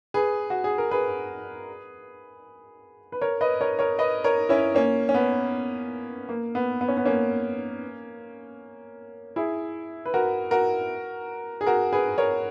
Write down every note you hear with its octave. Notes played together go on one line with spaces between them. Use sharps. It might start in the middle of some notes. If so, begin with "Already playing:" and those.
G#4 B4
F#4
G#4
A#4
G#4 B4
B4
A#4 C#5
B4 D#5
A#4 C#5
A#4 C#5
B4 D#5
A#4 C#5
C#4 E4
A#3 C#4
C#4
B3
A#3
B3
B3
C#4
B3
A#3 C#4
E4 G#4
B4
F#4 A#4
F#4 A#4
G#4
F#4 A#4
G#4 B4
A#4 C#5